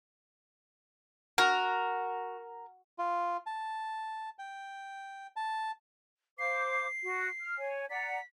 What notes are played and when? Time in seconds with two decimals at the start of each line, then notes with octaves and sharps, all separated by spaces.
1.38 F#4 A#4
2.98 F4
3.46 A5
4.39 G5
5.36 A5
6.39 C5 F5 D6 C7
7.03 F#4
7.41 F6
7.58 C#5 G#5
7.90 D5 F#5 A#5 B6